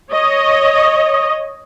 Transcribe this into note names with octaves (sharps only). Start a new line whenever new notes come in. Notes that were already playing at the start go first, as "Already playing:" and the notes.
C#5 D#5